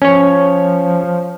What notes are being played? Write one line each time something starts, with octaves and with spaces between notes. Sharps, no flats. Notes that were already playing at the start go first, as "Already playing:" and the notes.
F3 C#4 C#5